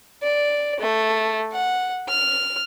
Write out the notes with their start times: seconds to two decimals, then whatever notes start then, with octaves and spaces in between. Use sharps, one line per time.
0.23 D5
0.80 A3
1.53 F#5
2.09 F6